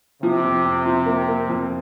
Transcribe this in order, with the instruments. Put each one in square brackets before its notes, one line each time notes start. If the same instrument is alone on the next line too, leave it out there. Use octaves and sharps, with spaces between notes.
[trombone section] C3 [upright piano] F3
[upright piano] F2
F2
F3
A#3
A#3
F2